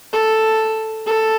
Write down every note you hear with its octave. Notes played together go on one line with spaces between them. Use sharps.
A4
A4